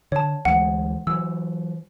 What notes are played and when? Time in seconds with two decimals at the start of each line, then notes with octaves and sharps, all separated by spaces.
0.12 D3 C#5 A5
0.45 D2 E3 G#3 F#5
1.07 E3 F#3 E6